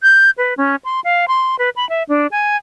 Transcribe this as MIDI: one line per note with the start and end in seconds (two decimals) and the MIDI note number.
0.02 0.30 91
0.38 0.54 71
0.57 0.76 61
0.84 1.00 84
1.04 1.25 77
1.28 1.56 84
1.59 1.69 71
1.76 1.88 83
1.89 2.03 76
2.09 2.27 62
2.31 2.56 80